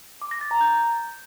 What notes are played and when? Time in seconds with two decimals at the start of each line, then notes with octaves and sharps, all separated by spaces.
0.22 D6
0.31 A#6
0.41 A6
0.51 A#5
0.61 G6